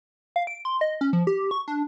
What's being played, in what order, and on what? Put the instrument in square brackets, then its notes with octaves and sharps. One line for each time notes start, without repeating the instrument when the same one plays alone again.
[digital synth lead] F5
D7
C6
D#5
C#4
F3
G4
C#6
D4